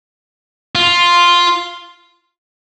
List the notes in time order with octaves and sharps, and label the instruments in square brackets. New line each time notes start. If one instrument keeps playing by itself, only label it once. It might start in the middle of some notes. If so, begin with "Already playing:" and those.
[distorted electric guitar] F4